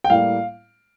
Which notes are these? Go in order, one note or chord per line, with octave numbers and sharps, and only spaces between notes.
G5
A2 G3 A#3 F5